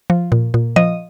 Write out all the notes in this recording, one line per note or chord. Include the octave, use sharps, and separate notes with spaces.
F3
A#2
A#2
F3 D#5